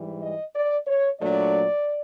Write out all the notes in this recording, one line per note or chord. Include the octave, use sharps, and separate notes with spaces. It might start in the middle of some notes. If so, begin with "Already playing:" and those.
Already playing: G#2 E3 G3
D#5
D5
C#5
A#2 F#3 A3 D4 D5